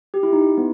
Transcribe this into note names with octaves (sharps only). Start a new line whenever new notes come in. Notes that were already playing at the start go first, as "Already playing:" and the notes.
G4
E4
D#4
E4
B3